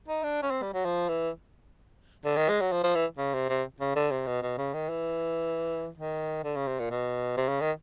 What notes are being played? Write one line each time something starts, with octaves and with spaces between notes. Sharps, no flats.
D#4
D4
C#4
C4
G3
F#3
F3
E3
D3
D#3
G#3
F#3
F3
F3
E3
C#3
C3
C3
C#3
D3
C3
B2
B2
C#3
D#3
E3
D#3
D3
C#3
C3
A#2
B2
C3
C#3
D#3